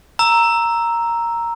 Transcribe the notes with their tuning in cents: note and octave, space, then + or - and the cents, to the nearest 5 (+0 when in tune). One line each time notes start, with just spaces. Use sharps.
A#5 +0 E6 +0